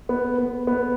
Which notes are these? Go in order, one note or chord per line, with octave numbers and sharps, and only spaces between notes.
B3
B3
B3